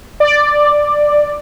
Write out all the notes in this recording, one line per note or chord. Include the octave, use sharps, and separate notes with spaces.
D5